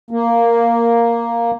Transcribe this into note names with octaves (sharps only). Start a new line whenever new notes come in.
A#3